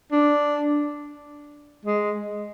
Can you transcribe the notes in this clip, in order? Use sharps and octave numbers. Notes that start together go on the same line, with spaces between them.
D4
G#3